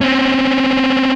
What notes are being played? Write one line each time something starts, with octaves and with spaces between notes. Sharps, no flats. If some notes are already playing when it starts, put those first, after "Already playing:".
C4 C#4